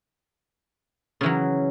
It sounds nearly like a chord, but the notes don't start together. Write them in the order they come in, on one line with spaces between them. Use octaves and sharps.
C#3 E3 F#3